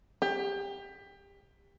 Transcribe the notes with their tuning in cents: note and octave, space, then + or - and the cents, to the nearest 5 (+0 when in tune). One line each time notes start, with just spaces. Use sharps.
G4 +25